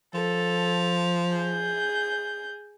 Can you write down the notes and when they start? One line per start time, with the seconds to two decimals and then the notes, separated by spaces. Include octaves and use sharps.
0.14 F3 A4
1.33 G#4 G6